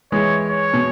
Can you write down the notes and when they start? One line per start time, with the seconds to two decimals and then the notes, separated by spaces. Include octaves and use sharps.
0.12 E3 G#3 C#5
0.48 C#5
0.73 B2